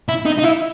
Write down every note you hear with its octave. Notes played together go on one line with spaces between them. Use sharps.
E4
D#4
D#4
E4